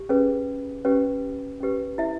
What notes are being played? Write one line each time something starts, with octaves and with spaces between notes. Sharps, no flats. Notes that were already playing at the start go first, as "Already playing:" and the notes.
Already playing: G4
C#4 G#4 B4
C#4 G4 B4
C#4 G4 B4
E4 E5